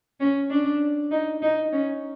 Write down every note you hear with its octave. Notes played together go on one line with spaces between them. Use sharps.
C#4
D4
D#4
D#4
C#4